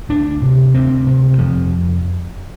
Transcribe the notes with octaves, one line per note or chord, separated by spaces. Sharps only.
D2 D4
C3
D2 C4
C3
F2 F3